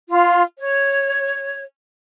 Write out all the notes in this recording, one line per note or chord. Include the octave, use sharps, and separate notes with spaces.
F4
C#5